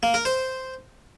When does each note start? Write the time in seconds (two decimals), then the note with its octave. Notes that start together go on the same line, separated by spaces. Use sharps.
0.03 A#3
0.14 A#4
0.25 C5